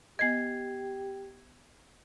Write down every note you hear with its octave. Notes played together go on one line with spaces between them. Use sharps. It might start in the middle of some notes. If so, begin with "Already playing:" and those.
B3 G4 D#5 G#6 C7